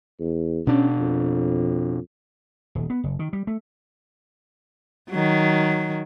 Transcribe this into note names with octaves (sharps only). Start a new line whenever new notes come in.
E2
B2 C#4 D4
F2
D#1
B3
F#1
D#3
G3
A3
D#3 F#3